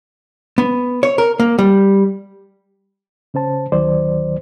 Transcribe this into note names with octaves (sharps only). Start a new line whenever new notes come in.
B3
C#5
A#4
A#3
G3
C#3 C#4 C5 A5
D2 D#3 F#3 C5 D5